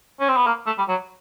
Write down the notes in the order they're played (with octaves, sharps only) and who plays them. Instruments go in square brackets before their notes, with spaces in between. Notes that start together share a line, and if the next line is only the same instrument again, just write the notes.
[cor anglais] C#4
C4
B3
A#3
A3
G3
F#3